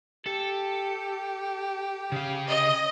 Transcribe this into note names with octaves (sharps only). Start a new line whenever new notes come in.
G4 A4
C#3 F5
D#5